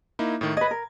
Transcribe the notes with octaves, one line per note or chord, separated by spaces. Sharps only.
A#3 D#4 E4
A2 D#3
B4 D#5 G#6
A#4